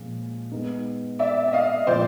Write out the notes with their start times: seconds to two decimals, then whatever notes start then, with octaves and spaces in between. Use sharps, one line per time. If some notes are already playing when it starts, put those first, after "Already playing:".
Already playing: A#2 F3 G#3 C#4
0.52 G#3 B3 D#4
1.19 D5 E5
1.48 E5
1.53 D#5 F5
1.87 A#2 F3 G#3 C4 F4 C5 D5